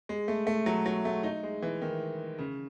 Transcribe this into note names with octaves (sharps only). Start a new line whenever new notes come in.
G#3
A3
A3
F#3
F#3
A3
D#4
G#3
E3
D#3
C#3